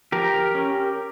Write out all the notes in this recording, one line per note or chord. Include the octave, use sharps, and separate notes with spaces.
F3 G4 A#4
C#4